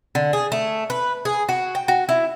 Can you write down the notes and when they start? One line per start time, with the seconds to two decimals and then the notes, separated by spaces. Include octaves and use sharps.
0.15 D3
0.33 G#4
0.52 A3
0.90 B4
1.25 G#4
1.49 F#4
1.75 G5
1.88 F#4
2.09 E4